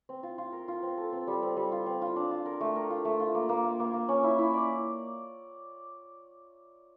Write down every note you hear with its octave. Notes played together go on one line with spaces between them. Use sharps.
C4
F4
F4
A#4
F4
C4
A4
C4
G3
C4
G3
F4
C4
F4
D4
F4
A#4
A3
A#4
F4
A3
F4
A#3
A#3
A#3
A#3
A#3
C#4
E4
E4
D5